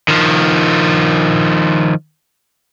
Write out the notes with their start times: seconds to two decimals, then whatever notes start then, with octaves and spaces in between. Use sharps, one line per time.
0.08 D#3 F3